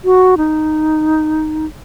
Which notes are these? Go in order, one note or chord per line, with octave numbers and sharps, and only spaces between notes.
F#4
D#4